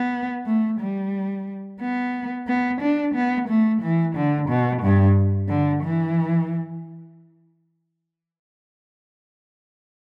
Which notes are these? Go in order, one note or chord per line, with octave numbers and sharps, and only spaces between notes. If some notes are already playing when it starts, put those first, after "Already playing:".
Already playing: B3
A3
G3
B3
B3
D4
B3
A3
E3
D3
B2
G2
D3
E3